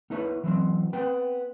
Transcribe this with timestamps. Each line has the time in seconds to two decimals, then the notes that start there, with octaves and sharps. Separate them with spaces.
0.10 B3 D#4 E4 B4 C#5
0.44 E3 F#3 A#3 C4
0.93 B3 C4 B4 G5